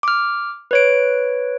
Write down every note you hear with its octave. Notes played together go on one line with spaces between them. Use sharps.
D6 F6
B4 C#5 D7